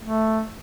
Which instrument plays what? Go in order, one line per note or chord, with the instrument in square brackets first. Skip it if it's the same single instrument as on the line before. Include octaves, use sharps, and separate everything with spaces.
[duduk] A3